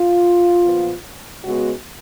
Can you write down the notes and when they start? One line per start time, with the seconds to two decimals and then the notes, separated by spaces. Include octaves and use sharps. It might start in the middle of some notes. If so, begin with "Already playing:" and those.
Already playing: F4
0.62 A#2 F3 B3
1.43 C#3 G#3 B3 F#4